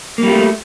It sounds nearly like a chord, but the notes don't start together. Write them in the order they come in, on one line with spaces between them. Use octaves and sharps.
A#3 G3 F4 A3